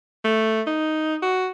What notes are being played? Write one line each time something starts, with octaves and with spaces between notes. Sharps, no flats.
A3
D#4
F#4